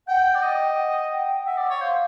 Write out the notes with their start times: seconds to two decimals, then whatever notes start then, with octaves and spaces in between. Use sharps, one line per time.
0.08 F#5 G5
0.35 D5
0.43 D#5 G5
0.78 F#5
1.13 G5
1.46 E5 F#5
1.58 D5
1.70 C#5
1.81 C5 F5